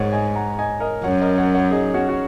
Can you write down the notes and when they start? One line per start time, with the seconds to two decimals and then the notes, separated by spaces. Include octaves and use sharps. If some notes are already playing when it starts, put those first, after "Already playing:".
Already playing: G#2 A#4 C#5 D#5 F#5
0.12 D#5 G#5
0.35 F#5 A#5
0.59 D#5 G#5
0.80 A#4 D#5
1.03 F#2 C#5 F#5
1.21 A#4 D#5
1.37 C#5 F#5
1.55 C#5 F#5
1.71 D#4 G#4
1.94 C#4 F#4
2.09 F#4